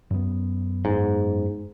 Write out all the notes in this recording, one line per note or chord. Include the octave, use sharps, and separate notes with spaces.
F#2 B3
G#2